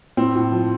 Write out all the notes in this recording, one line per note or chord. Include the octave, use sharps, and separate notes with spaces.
A2 C4
A2
F3